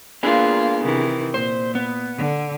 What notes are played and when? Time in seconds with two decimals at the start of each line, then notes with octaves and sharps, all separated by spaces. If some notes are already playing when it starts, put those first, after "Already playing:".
0.23 A#3 B3 D4 F4 G#4
0.83 C3 D#3 E3
1.34 A#2 C5
1.75 B3
2.18 D3